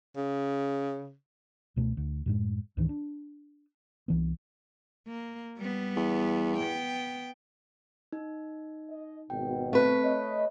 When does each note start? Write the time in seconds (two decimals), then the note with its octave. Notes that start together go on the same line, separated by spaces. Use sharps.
0.17 C#3
1.76 C#2 B2 F#3 A3
1.97 D2
2.26 F#2 A2 G#3
2.77 C#2 G#2 D#3 E3
2.89 D4
4.08 C2 E3 B3
5.08 A#3
5.58 G3 B3
5.96 E2
6.57 B3 G5
8.12 D#4
8.90 D#5
9.30 G#1 B2 G5
9.73 A3 C4 B4
10.04 C#5 D#5